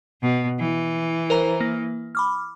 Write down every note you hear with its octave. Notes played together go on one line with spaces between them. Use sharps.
B2
E3
A#4 C5 A#5
A#3
B5 D6 F6